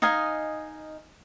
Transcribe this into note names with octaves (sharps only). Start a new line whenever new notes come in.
D#4 D#5 F5 G#5